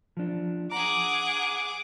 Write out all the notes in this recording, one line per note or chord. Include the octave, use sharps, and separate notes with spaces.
F3 D4
G#4 F#5 A#5 D6